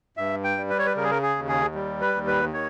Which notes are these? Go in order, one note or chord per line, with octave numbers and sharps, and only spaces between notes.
G2 E5
G5
G3
B4
C#5
B4
C#3 A#4
G#4
A#4
G#4
D#2
G#4
G3
B4
D#2
B4
D#3 C#5